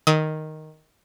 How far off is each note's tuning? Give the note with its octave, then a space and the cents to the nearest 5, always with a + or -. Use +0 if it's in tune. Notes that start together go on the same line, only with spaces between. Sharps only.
D#3 +0 D#6 +35